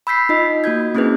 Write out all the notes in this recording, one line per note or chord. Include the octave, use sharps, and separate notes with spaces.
B5 E6 G6 B6 C7
D#4 F4 D#5
A#3 F#4 G6 G#6
A#3 C4 C#4 E4 G#4 B4